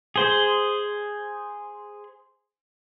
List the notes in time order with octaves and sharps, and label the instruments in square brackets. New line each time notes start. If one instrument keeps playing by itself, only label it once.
[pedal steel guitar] G#4 C5